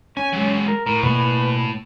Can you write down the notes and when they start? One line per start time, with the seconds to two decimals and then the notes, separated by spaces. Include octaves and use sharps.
0.17 C#4 G#5
0.33 F#3 G#3
0.68 A#4
0.86 A2 A#4
1.03 B2 A#3 B4